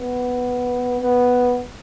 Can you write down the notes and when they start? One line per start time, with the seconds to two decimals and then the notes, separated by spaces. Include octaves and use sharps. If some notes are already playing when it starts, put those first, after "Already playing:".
Already playing: B3
1.01 B3